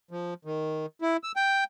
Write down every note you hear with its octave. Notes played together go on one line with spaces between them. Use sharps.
F3
D#3
E4
E6
G5